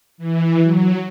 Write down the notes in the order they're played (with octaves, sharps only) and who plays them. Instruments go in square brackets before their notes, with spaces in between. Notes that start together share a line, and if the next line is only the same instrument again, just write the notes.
[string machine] E3
F#3